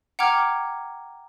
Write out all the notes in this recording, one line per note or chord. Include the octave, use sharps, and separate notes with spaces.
F#5 G5 A#5 D6 F6 G#6